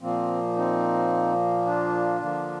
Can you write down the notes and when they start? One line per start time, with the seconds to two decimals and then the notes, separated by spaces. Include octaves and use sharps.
0.01 A#2 F3 A#3 C4
0.56 C4 D#4
1.66 D4 F4
2.21 D3 F3 A#3